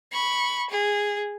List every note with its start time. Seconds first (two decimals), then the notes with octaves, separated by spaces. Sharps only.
0.12 B5 C#6
0.69 G#4